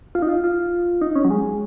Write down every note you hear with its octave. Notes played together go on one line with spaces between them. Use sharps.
F4
D#4
F4
F4
D#4
C#4
F#3
G#3